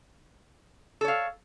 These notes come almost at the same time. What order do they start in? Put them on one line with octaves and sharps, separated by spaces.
A4 C#5 F5